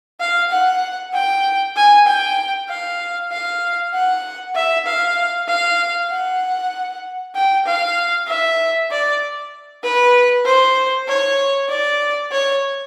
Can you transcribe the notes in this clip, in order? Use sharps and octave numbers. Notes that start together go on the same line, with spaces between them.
F5
F#5
G5
G#5
G5
F5
F5
F#5
E5
F5
F5
F#5
G5
F5
E5
D5
B4
C5
C#5
D5
C#5